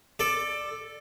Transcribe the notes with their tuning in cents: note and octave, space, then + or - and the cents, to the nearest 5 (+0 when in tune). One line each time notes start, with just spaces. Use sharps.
A4 -5 D5 +15